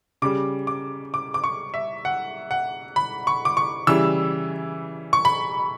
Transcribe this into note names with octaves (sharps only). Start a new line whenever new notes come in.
C#3 G3 D6
D6
D6
D6
C#6
E5
F#5
F#5
B5
C#6
D6
C#6
C#3 E3 G3 E6
C#6
B5